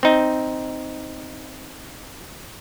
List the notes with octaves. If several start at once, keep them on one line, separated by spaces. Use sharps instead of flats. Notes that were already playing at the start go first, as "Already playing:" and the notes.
C4 D#4